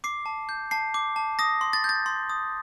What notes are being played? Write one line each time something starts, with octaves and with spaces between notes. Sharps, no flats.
D6 C7
A5
G6
A5 C7
D6
A5
D#6 A#6
C6
A6
G6 A6
C6
D#6